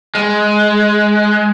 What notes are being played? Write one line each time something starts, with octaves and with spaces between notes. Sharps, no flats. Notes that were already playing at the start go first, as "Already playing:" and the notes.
G#3